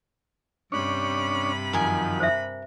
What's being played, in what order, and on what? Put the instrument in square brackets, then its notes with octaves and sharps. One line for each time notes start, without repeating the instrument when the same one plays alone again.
[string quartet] G2 C3 B5 [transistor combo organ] C#4 D4 C#5
[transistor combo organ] F#2 D#3 F3 [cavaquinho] A#4 G#5
[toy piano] C5 E5